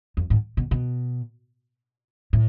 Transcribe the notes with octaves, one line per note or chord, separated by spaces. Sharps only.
F2
G#2
B2
B2
A2